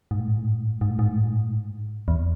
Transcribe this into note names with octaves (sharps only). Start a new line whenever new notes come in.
G#2
A2
G#2
A2
G#2
A2
G#2
A2
G#2
A2
G#2
A2
G#2
A2
G#2
A2
G#2
E2